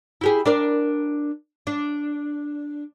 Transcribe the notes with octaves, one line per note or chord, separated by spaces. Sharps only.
E4 G4 G#4
D4 A#4 D5
D4